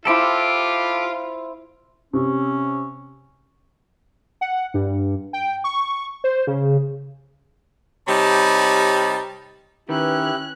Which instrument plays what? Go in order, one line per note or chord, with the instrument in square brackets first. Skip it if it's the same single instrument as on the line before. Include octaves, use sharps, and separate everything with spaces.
[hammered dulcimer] E4 C5 B5 [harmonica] F4 [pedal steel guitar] G4 A4
[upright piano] C3 [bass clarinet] C#4
[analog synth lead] F#5
G2
G5
C#6
C5
C#3
[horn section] C3 G3 D#4 C#5 A5 B5
[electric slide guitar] D#3 [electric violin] C#4 F#6 [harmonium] E4 G4 [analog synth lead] B4